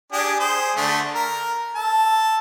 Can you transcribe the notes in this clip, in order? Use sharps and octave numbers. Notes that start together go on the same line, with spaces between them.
D4 G4 G#4
G#4 C5
D3 A3
A#4
A4 A5